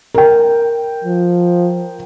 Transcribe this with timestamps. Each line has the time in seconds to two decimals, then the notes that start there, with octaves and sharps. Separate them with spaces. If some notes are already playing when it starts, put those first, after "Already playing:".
0.14 A#4 G5
1.04 F3